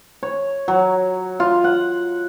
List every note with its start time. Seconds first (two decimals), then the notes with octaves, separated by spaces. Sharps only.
0.23 C#5
0.68 F#3
1.40 F4
1.64 F#5